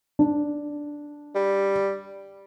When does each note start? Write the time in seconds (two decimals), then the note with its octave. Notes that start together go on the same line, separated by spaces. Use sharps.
0.19 D4
1.35 G3